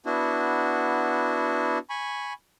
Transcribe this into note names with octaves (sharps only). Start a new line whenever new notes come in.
B3 D4 E4 F#4
G#5 B5 C#6